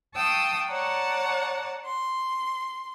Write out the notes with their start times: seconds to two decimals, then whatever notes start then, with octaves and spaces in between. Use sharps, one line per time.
0.16 F5 G5 A5 C#6 D#6 E6
0.70 C#5 D5 F#5 A5 A#5
1.87 C6